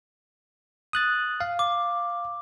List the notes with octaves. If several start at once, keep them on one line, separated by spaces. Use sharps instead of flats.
D#6 F#6 A6
F5
D6